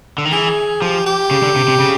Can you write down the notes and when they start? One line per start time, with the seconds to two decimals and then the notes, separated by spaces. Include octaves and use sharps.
0.18 D3
0.25 D#3
0.32 E3 G#4
0.81 F3 G4
1.06 G4
1.31 C#3
1.43 D3
1.56 C3
1.68 C3
1.80 C#3